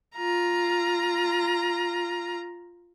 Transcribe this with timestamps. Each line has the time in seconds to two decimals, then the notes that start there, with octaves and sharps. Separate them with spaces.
0.16 F4 A#5